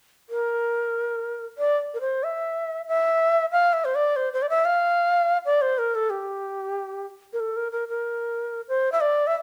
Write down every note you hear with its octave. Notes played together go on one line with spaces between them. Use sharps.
A#4
D5
A#4
C5
E5
E5
F5
E5
C5
D5
C5
C5
D5
E5
F5
D5
C5
A#4
A4
G4
A#4
A4
A#4
A#4
A#4
C5
E5
D5
E5